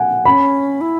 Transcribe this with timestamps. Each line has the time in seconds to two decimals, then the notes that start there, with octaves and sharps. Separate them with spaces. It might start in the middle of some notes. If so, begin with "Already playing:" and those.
Already playing: F#5 G#5
0.25 C#4 B5
0.81 E4